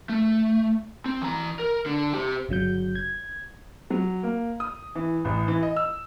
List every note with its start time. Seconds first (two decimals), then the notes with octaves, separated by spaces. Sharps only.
0.09 A3
1.06 C4
1.22 E3 A#5
1.59 A#4
1.86 D3
2.15 G4 C5
2.49 G1 C#3 F#3 G6
2.95 G#6
3.90 F#3
4.23 A#3
4.60 D#6
4.95 E3
5.25 A1
5.48 E3
5.62 D#5
5.76 E6